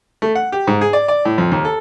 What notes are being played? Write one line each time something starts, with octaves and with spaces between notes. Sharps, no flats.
A3
F#5
G4
G#2
G#4
D5
D5
A2
F2
D#2
A4